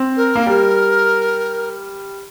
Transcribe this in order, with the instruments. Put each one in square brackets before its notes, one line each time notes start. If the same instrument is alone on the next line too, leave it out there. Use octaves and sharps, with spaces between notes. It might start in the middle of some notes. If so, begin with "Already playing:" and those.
Already playing: [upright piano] C4
[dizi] A#4
[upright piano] A#3
G3